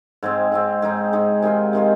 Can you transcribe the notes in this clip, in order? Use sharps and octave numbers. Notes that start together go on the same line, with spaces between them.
G#2 G#3 C4
G#2 G#3 C4
G#2 G#3 D#4 G#4
G#2 G#3 D#4 G#4
C3 D#3 G#3 F4
C3 D#3 G#3 F4